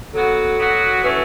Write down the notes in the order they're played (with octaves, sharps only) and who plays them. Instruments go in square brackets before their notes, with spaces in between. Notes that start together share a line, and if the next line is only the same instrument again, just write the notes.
[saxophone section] F#3 B3 F#4 [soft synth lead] A4
[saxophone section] F#3 B3 F#4
[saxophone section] E3 A3 C#4 F#4 [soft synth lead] B4